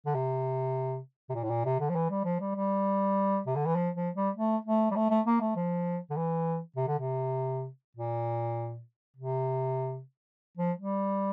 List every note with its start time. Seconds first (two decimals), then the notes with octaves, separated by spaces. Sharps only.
0.06 D3
0.14 C3
1.30 C3
1.34 A#2
1.44 A2
1.50 A#2
1.65 C3
1.80 D3
1.89 F3
1.95 E3
2.10 G3
2.25 F3
2.40 G3
2.55 G3
3.46 C3
3.56 D3
3.65 E3
3.76 F3
3.96 F3
4.15 G3
4.36 A3
4.65 A3
4.91 G3
4.96 A3
5.10 A3
5.26 A#3
5.41 A3
5.56 F3
6.10 D3
6.17 E3
6.76 C3
6.87 D3
6.98 C3
7.97 A#2
9.17 C3
10.57 F3
10.77 G3